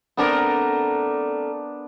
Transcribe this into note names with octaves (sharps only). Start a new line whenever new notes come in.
A3 B3 C4 D4 A#4